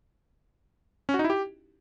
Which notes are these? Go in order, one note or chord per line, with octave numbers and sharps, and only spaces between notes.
C#4
F#4
D#4
E4
G4